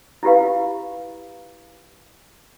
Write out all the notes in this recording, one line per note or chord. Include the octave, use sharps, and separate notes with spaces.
E4 F4 G4 B4 F5